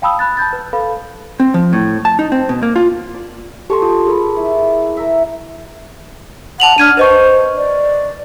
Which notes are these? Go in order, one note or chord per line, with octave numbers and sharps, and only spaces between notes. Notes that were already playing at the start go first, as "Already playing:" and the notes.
F5 G5 A5 B5 D#6 E6
B5 F#6 A6
A5 B5 G6 A6
B4
A4 B4 F5 B5
C4
F3
A2
A5
D#4
C4
B2
A#3
F4
D5
G4 A4 A5 C6 C#6
F4 D#6
G#4 A#4 B5
E4
A#4 E5
F#5 A5 F7 F#7
D4 F6 G#6 D#7
B4 C5 D#5 C#6
D5